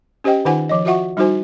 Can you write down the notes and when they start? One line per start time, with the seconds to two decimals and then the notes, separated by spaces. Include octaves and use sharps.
0.24 C#4 G4 C5 D#5 G5
0.45 D#3 D#4 F4 C5 F#5 G#5
0.69 F3 D#5
0.85 F4 F#4 E5 F#5 C#6
1.17 G3 D#4 E4 F#4 C5 G#5